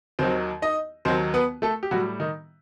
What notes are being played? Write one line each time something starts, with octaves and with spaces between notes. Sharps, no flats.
D#2 D#3 F#3 C4 C5
D#4 D#5
D#2 D#3 F#3 C4 C5
B3 B4
A3 A4
G4
A2 F#3 G3 F#4
D#3 D#4